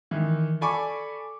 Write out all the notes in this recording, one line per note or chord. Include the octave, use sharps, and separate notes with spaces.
D#3 E3
A4 D5 G#5 B5 C#6 D6